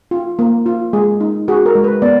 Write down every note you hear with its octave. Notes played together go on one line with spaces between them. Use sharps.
F4
A#3
F4
G#3 G#4
D#4
F#4 G#4
A#4
G#3
B4
B3 D5